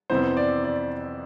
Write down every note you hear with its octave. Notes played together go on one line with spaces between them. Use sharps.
F2 C3 E3 B3 C5
D5
D5